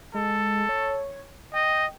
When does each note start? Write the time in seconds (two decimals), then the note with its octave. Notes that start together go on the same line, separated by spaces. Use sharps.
0.14 G#3 A4
0.69 C#5
1.54 D#5 G5